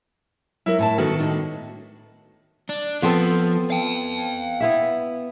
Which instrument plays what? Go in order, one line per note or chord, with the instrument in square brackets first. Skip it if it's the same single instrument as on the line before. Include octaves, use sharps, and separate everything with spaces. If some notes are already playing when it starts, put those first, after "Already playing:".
[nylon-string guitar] F#3 A#4 [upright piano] E4
[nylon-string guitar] A2 G#5 A5
[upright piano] D#3 [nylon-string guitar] B3 F#4 A4
[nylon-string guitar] A2 D4 D#4
[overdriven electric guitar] D4
[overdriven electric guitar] F3 [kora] B3 C4 A4
[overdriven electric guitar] F5 G5
[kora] B3 E4 E5